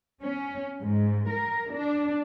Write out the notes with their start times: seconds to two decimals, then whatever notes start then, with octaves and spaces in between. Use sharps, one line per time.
0.21 C#4
0.82 G#2
1.30 A#4
1.72 D4